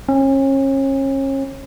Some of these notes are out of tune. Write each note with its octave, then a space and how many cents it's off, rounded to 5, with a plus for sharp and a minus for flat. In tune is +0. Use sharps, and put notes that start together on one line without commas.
C#4 -35